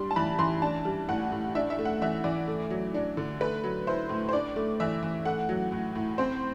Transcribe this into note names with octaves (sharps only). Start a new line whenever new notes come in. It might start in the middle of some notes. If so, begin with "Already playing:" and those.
Already playing: G3 D4 C6
A5
E3 B5
E3 C6
D4 A5
G3
A2 F#5
A2
D4 E5
E5
A3
F#5
E3 E5
E3 D5
A3
F#3
D4
D3
A3 B4
F#3
E4 C5
A2
C5
D4 D5
A3
E3 E5
E3
A3 F#5
F#3
A2
A2
C4 C5